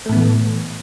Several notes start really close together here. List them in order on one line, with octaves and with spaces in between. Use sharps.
A3 A2 B3 E3